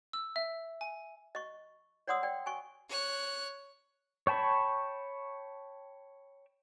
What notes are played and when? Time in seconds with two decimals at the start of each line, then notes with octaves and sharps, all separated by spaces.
0.13 E6
0.36 E5
0.81 G#5
1.35 D#5 C#6
2.07 C#5 D5 F#5 C6 D#6 E6
2.23 D5 G5
2.46 G#5 C#6
2.89 C#5 F#6
4.27 C#5 G5 A5 B5 C#6